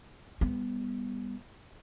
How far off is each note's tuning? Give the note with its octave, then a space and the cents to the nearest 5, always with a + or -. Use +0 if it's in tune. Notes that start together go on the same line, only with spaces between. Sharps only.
G3 +25 B3 +0